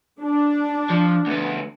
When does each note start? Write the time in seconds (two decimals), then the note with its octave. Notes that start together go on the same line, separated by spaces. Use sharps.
0.21 D4
0.90 F3
1.27 D2 B3